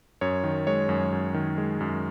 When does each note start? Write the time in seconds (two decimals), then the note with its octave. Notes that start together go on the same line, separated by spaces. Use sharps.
0.21 F#2 C#5
0.44 D#3
0.67 G#3 C#5
0.89 F#2
1.12 F#2
1.34 D#3
1.58 G#3
1.80 F#2